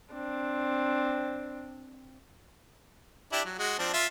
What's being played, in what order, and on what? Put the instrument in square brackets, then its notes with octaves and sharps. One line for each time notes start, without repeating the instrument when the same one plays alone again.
[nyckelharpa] C4 D4
[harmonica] D4 E4 G4
F#3
G#3 F#4
F3 C4 D4
F4 E5